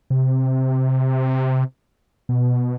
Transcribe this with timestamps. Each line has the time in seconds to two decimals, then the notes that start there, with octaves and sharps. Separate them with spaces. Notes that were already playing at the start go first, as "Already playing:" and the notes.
0.10 C3
2.29 B2